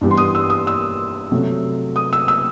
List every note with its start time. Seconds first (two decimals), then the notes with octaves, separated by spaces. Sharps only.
0.01 G2 E3 G3 B3
0.11 C6
0.17 D#6
0.35 E6
0.50 D#6
0.67 E6
1.32 C3 F#3 A3
1.96 D#6
2.13 E6
2.28 E6